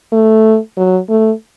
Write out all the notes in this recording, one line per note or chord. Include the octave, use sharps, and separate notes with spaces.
A3
F#3
A3